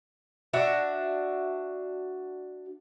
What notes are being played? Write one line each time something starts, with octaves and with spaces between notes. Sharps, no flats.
D4 F#4 E5